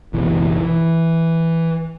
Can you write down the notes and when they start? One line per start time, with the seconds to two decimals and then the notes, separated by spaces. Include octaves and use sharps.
0.13 F#1 B1 E3
0.57 E3